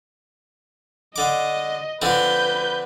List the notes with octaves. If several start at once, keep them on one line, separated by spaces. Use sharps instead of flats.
D3 D#5 D6
D3 F3 C4 B4 G6